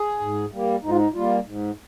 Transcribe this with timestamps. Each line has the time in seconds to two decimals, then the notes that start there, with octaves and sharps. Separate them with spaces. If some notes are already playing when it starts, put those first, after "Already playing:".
Already playing: G#4
0.20 G#2
0.51 G3 A#3
0.82 G#2 D#4
0.90 F4
0.96 D#4
1.14 G3 A#3 F4
1.46 G#2